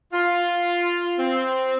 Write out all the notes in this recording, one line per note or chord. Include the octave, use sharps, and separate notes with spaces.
F4
C4